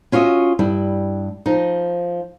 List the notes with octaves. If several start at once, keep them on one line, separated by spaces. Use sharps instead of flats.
C#4 F4 F#4 C5 D#5 E5
G2 G3 E4
F3 D#4